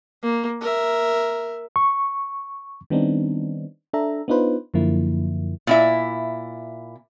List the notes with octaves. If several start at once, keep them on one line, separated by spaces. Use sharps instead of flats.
A#3
A#4 E5
C#6
D#3 G3 B3 C4 D4 D#4
D4 A4 E5 A#5
B3 D4 D#4 F4 B4 C5
F#2 D3 F3 A#3 E4
A#2 E4 E5